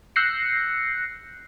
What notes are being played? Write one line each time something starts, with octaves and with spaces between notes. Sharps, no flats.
E6 F#6 G6 A#6 C7 C#7